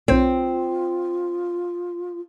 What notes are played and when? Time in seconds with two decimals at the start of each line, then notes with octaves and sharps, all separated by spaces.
0.08 B1 C4 F4 C5 C#5